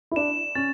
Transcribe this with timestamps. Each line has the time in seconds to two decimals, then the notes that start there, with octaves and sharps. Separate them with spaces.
0.11 E4
0.16 D4 E7
0.55 C#4 A6